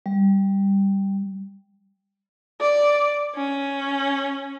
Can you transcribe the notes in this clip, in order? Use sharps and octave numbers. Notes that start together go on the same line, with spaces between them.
G3
D5
C#4